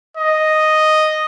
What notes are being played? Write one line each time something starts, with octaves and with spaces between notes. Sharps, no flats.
D#5